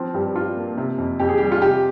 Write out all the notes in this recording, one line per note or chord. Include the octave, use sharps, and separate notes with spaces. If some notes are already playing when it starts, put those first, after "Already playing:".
Already playing: F3 C4 C5
G2 G4
D4 F4
A#3
C3
F2
F2 G4
G#4
G3 G4
F4
C3 G4